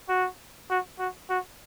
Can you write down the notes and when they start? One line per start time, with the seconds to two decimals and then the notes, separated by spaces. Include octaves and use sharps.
0.09 F#4
0.70 F#4
0.99 F#4
1.30 F#4